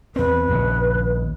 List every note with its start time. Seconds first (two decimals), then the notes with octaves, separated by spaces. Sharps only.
0.16 E2 C4 B4
0.50 A#1 D#2 C#3